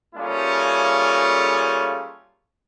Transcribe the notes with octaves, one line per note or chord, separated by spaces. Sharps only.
G3 A3 A#3 C#4 F4 G#4